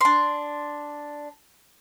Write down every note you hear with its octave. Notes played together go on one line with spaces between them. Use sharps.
D4 C6